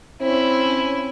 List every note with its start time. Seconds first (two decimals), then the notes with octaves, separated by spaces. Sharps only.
0.22 C4 C#4 E4